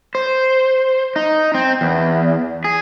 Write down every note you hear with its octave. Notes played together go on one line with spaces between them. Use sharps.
C5
D#4
C4
E2
G#4